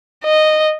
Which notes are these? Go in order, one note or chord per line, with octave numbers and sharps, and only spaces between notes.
D#5